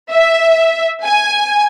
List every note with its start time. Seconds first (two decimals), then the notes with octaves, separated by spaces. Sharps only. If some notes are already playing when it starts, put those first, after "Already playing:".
0.11 E5
1.03 G#5